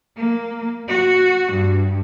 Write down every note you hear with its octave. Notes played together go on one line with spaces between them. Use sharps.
A#3
F#4
G2